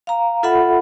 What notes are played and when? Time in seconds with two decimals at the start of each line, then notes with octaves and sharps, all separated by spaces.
0.07 F5 A#5
0.43 F4 A4 E5 F#5 B5